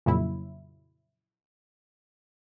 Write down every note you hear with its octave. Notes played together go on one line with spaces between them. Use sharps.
F2 A#2 C#3 F#3 E4